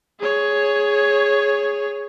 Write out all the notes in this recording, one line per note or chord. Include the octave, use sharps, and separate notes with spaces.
G#4 C#5